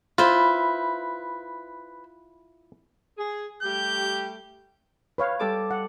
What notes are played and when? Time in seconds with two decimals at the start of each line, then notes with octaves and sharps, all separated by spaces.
0.18 E4 F4 B4 C5
3.18 G#4
3.63 G3 A3 G4 G6
5.18 B4 C#5 F5
5.39 G3 A4 D6
5.71 F#5